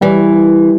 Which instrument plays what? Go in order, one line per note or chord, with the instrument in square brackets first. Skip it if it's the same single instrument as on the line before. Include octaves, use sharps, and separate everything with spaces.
[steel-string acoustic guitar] E3 [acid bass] G3